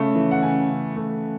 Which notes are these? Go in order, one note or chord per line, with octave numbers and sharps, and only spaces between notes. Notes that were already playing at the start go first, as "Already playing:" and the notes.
Already playing: C#3 A3
E3
F#5
C#3 G#5
C#3
A3